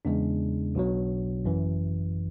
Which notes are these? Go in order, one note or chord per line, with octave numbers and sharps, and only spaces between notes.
E2 C#3 G#3 D4
B1 B2 F#3
G#1 F#2 E3